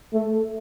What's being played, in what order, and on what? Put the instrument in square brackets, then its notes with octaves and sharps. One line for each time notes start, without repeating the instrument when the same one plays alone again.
[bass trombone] A3